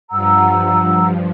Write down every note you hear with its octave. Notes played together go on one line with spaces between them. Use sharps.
G2 F3 F#5 A#5 E6